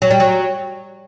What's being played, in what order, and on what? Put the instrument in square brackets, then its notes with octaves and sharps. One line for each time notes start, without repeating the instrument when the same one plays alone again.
[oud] F#3
G3
F#3